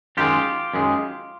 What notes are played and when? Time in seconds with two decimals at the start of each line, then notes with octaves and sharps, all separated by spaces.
0.17 F#2 D#3 G#3 F4 G4
0.74 F#2 D#3 G#3